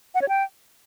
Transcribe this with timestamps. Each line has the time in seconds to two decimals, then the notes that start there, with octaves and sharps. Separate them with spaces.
0.15 F#5
0.22 C#5
0.29 G5